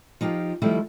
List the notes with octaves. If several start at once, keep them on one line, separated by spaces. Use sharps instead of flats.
F3 D#4 F4 G4
D#3 F3 G3 A3 E4